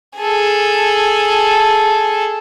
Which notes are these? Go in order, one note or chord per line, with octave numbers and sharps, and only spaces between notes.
G#4 A4